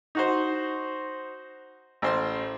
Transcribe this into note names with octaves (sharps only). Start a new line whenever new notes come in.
D#4 F#4 C5
A1 C5 C6